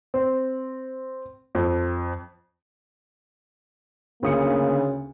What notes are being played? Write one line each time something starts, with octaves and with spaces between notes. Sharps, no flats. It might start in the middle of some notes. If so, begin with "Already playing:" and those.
C4
F2
D2 C#3 A#3 D#6 C#7